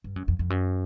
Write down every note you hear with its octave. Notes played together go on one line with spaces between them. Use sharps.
G2
F#2
F2
F2
F#2